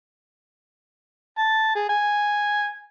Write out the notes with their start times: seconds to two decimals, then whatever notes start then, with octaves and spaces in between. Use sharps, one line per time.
1.38 A5
1.75 G#4
1.89 G#5